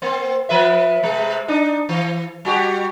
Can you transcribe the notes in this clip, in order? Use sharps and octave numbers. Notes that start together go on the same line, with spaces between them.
A#3 C4
F3 B4 E5
C3 G#3
D4 D#4
E3
G3 F#4 G4